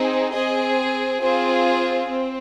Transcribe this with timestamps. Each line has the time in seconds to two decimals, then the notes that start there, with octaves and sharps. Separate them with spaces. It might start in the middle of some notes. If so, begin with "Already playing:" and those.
Already playing: C4 D#4 G#4
0.33 C4 G#4 D#5
1.21 C4 F4 G#4 C5
2.10 C4